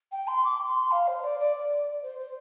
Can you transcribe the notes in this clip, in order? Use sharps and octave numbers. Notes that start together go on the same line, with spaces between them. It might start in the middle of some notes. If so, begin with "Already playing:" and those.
G5
C6
D6
C6
C6
F5
C5
D5
D5
C5
C5